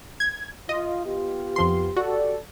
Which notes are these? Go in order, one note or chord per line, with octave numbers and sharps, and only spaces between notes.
G#6
F4 D#5
B3 F4 G4
F2 F3 C6
F#4 G4 A4 D5